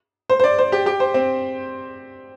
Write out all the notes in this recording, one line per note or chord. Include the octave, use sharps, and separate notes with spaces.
C5
C5
D5
C5
G4
G4
C5
C4